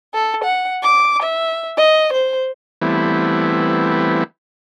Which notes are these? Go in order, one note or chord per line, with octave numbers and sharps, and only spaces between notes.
A4
F#5
D6
E5
D#5
C5
E3 G3 A3 B3 C4 E4